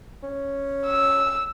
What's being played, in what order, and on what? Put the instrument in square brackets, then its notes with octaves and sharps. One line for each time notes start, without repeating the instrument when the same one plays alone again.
[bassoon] C#4
[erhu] E6